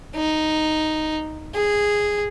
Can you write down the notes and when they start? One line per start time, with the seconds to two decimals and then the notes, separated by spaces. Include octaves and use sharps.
0.16 D#4
1.55 G#4